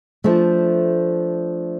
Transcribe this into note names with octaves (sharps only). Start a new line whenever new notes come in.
F3 A3 D4